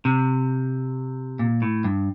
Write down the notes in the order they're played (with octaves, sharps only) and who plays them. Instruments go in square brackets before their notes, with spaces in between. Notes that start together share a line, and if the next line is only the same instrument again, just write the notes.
[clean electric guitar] C3
A#2
A2
G2